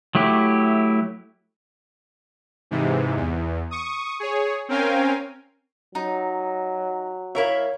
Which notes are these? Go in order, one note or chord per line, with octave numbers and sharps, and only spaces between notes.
F#3 A3 E4 G4
G#2 C3 E3
E2
C#6 D#6
G#4 C#5
C4 C#4 A#4 F5 G5 G#5
F#3 D#4
E4 A#4 C#5 E5 F5